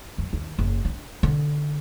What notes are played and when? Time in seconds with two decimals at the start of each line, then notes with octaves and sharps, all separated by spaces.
0.18 F#2
0.33 D#2
0.59 F#1
0.85 D4
1.23 D3